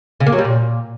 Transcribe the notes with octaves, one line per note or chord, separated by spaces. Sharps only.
C#3
A#3
F#3
G3
A#2